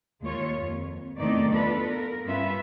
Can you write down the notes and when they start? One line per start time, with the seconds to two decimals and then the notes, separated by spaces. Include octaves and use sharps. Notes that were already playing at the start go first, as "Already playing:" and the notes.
0.22 D#2 G#3 F4 C#5
0.59 F2
1.18 E2 C3 D#3 A3 D#4 D5
1.51 E2 B3 D4 F4 A4 B4
1.88 A#4
2.24 G2 B3 C#4 F4 B4 E5